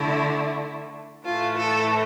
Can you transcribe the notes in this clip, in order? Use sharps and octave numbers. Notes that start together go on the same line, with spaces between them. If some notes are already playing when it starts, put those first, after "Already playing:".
Already playing: D3 A3 E4
A2 E3 A3 F4
A4